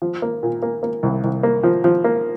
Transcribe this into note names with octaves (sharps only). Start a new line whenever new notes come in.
F3
A#3
A#2
A#3
A#3
C2
C2
A#3
F3
F3
A#3